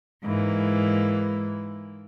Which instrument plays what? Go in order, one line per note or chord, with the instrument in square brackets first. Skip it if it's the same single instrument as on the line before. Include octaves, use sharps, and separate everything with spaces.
[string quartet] G#2 E3 A#3